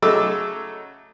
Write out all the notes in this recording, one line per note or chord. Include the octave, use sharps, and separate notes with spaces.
C#3 F#3 A3 D#4 D6 E6